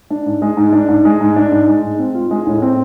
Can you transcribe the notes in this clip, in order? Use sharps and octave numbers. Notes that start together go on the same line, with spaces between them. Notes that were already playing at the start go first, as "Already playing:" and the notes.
D4
G#2
G#3
G#2
D4
G#2
G#3
G#2
D4
G#2
G#3
G#2
C4
F4
G#3
A2
C4